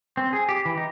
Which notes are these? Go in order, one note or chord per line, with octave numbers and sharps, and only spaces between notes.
C4
G#4
G4
E3
D#4